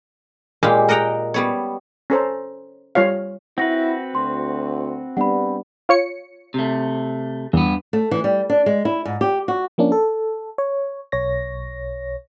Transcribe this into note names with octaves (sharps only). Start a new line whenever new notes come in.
A#2 G#3 G4 F5 B5
A#4 D#5 F#5 G5 A#5
G3 B3 C#5
C#4 A4 C5 A#5
G3 F4 C#5 F5
C4 E4 F#4 B4 F#5 A#6
D2 C6
G3 B3 D4 F#5 B5
F4 C#5 C#7
C3 A3
E2 G2 B3
A3
E3
G3
D4
G#3
E4
G#2
G4
F#4
F3 A#3 C#4 D4
A4
C#5
B1 C#5 A#6